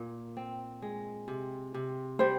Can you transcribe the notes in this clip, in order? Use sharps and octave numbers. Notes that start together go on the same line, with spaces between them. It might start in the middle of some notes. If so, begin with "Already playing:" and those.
Already playing: A#2
C4
G#3
C3
C3
G3 C5